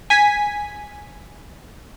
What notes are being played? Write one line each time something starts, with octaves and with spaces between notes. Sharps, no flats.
G#5 B6